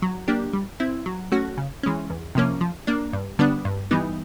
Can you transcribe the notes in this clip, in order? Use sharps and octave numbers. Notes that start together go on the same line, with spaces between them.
F#3
A#3 D4 G4
G3
C4 E4
F#3
A3 C#4 F#4
C#3
E3 G#3 C#4
E2
C3 F3 A#3 C#4
F3
A#3 D4
G2
D3 G3 B3 D4
G2
E3 G3 B3 D#4